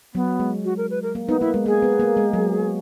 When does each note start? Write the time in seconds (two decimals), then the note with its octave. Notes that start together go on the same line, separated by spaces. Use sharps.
0.14 F#3 B3
0.40 G#3
0.65 F#4
0.77 A#4
0.90 B4
1.03 A#4
1.15 A#3
1.28 B3 D#4
1.41 A#3 E4
1.54 G#3
1.66 A#3 G#4
1.82 B3
2.00 A#3
2.17 G#3
2.33 F#3